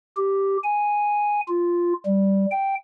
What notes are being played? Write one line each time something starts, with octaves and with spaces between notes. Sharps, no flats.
G4
G#5
F4
G3
G5